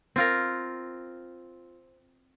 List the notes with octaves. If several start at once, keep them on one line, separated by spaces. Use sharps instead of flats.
C4 F4 A#4